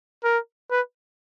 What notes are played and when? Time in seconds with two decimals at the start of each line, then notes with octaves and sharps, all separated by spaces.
0.24 A#4
0.71 B4